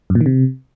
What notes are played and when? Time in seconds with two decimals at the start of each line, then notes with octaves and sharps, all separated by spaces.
0.10 F#2
0.15 A#2
0.21 D#3
0.26 C3